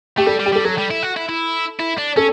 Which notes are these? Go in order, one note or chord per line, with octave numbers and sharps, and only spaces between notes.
A3 G4
G3 A4
G3
G4
G3 A4
F#3 A4
G3
E4
F#4
E4
E4
E4
D4
C#4 A4